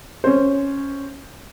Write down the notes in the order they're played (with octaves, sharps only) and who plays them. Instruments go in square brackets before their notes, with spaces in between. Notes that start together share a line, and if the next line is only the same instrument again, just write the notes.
[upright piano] C#4 C5